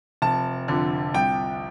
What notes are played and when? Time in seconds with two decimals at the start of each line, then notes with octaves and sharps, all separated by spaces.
0.22 F1 A5
0.68 F2 D3
1.14 C2 G5